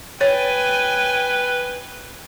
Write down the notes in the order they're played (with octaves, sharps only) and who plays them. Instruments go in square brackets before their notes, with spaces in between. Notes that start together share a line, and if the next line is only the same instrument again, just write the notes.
[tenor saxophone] B4 [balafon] C#5 [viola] G5 G#5